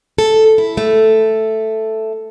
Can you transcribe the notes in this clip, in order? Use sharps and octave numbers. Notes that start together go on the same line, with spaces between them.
A4
E4
A3